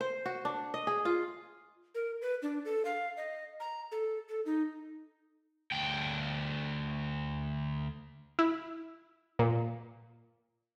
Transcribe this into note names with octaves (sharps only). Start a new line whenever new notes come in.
C5
F#4
D4
D#5
G#4
F4
A#4
B4
D4
A4
F5
D#5
A#5
A4
A4
D#4
D2 G5
E4
A#2